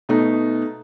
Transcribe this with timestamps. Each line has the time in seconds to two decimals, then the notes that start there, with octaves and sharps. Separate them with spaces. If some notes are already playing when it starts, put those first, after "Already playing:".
0.09 B2 A3 D#4